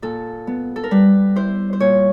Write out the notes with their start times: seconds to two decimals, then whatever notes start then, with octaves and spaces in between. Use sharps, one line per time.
0.02 A#2 A4
0.47 B3
0.76 A4
0.84 A#4
0.91 G3 B4
1.36 E4 C5
1.73 C5
1.80 A#2 C#5